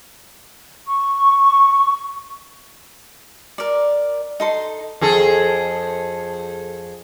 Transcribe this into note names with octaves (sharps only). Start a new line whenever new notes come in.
C#6
A#4 D5
D#4 A4 C6
F2 G#4 A4